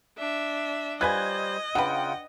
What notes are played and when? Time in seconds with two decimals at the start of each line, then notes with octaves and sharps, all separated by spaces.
0.18 D4 E5
1.01 G3 F4 B4 C5 D#5 G#5 F#6 G#6
1.75 C#3 D4 F4 B4 F#5 G5